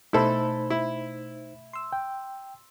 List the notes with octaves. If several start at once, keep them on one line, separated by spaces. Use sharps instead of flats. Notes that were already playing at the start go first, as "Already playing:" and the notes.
B2 A3 D#4 E4 A4 C5 B5
E4
C6 E6
G5